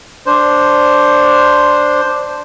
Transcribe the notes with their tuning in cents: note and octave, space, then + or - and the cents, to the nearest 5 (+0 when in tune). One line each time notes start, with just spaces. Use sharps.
D4 +0 C5 +0